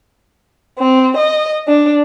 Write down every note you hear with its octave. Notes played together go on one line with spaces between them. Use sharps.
C4
D#5
D4